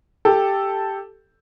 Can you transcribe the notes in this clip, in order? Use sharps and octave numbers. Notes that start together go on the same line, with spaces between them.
G4 A4